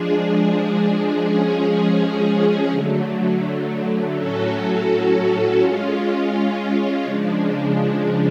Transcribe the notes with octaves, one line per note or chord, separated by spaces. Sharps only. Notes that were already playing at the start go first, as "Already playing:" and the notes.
Already playing: F3 G#3 D4 G#4
F3 G#3 C#4 G#4
D3 F#3 A3
A2 F#3 C#4 F#4 A4
G#3 C#4 F4
C#3 F3 G#3 D4